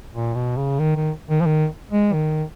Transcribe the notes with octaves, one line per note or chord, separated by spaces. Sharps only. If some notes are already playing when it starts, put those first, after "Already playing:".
A#2
B2
C#3
D#3
D#3
D#3
F3
D#3
G#3
D#3